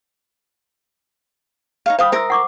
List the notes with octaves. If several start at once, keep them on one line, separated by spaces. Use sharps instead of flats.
D#4 C#5 F5
C5 F5 G5 B5 D#6
A#4 C5 E5 C6 E6
F#5 C#6 D6